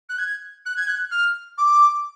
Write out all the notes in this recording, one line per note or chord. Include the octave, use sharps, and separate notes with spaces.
F#6
G#6
F#6
G#6
F#6
F6
D6